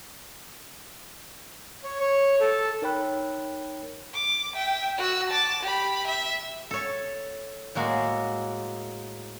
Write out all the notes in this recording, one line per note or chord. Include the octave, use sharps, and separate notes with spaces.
C#5
C#5
A4
D#4 A#4 C#5 G5 B5 F#6
D6
E5 G5
F#4 E6
A5 D6
G4 B5
E5
A4 C#5
A2 G#3 A#3 F#4 G#4